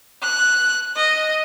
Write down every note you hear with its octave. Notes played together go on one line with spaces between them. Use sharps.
F#6
D#5